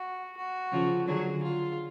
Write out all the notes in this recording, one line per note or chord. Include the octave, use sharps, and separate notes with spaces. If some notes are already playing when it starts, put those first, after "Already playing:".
Already playing: F#4
F#4
C#3 F3
D3 F#3 G#4
F4